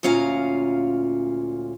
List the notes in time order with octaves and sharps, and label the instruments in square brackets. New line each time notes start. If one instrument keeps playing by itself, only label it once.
[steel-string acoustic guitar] D2 A#2 C#4 F4 F5 A#5